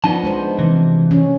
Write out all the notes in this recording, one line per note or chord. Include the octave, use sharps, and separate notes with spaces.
F3 B3 D4 D#4 A5
G#3 D4 C5
C3 E3
C#4